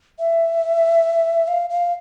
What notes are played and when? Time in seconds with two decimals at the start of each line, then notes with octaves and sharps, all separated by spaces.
0.19 E5
1.48 F5
1.70 F5